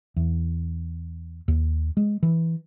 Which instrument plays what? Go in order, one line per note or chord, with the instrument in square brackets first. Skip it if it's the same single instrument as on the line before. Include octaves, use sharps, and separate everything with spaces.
[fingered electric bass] E2
D#2
G#3
E3